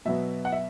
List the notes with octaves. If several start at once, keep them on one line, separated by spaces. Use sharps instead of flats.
B2 F#3 B3 E5
F#5
E5